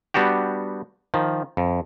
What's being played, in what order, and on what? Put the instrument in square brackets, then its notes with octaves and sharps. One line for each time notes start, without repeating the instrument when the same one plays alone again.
[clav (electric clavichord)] G3 B3 D4 F#4 G4
D#3 F3
F2